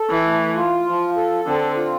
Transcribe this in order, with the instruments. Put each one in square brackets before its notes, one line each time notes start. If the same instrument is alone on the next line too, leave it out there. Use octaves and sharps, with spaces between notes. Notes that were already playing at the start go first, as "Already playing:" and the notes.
Already playing: [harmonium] A4
[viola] E3
[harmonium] A3
F4
F3
A4
[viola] D3 [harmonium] C4
[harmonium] F4